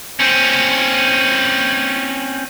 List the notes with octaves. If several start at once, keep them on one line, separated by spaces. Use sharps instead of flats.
C4 C#4